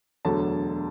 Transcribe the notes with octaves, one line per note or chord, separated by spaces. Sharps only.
E1 D2 D3 F#3 A5